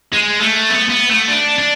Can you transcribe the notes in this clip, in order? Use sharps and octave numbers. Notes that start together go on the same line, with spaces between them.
G#3
A3
B3
B3
A3
D4
D4